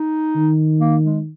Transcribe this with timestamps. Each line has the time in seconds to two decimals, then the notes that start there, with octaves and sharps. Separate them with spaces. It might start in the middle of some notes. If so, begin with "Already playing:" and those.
Already playing: D#4
0.36 D#3
0.80 A#3
1.04 G#3